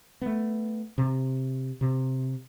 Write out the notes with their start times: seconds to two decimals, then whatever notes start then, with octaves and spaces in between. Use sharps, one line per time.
0.22 A3 B3
0.98 C3
1.81 C3